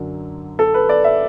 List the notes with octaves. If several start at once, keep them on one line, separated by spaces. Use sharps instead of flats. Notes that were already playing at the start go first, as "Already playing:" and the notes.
Already playing: F#2 D3 F#3
A4
B4
D5
E5